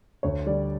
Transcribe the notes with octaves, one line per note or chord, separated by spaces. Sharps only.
D2 C#5
D3 G3 D5